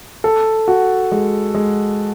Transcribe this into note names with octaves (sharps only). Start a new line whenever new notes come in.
A4
F#4
G#3
G#3